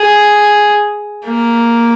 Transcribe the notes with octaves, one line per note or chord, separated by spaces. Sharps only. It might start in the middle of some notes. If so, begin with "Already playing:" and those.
Already playing: G#4
A#3